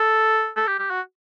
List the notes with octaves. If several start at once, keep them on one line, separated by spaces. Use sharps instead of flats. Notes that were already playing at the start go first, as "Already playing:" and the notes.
Already playing: A4
A4
G4
G4
F#4